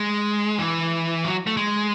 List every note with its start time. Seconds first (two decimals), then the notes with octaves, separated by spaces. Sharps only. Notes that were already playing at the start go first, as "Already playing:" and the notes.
Already playing: G#3
0.59 E3
1.24 F#3
1.47 A3
1.57 G#3